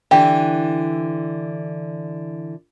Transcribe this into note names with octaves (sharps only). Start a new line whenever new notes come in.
D3 E3 G4